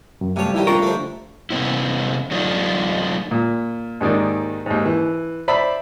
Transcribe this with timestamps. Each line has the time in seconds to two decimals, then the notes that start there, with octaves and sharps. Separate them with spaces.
0.21 F#2
0.36 G2 C3 F3 A3 C#5
0.54 C#2 D#3 G3 E4
0.67 D4 F4 A#4 G5 C#6
0.82 D3 A3 C4 G4 D#5
1.50 C3 B3 C#4 E4
2.31 F#3 A3 D4 D#4 F4
3.31 A#2
4.01 D#2 G#2 D#3 D5
4.66 D#2 G#2
4.86 E3
5.48 C5 D5 E5 B5